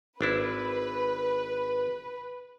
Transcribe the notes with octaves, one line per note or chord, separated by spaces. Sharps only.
G#1 D4 E4 B4